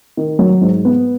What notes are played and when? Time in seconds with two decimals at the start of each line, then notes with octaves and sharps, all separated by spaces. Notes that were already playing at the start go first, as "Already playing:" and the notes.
0.17 D#3
0.39 F#3
0.61 G#2
0.85 B3